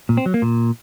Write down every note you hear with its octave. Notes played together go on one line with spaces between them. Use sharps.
A#2
C4
F#3
A#3
A#2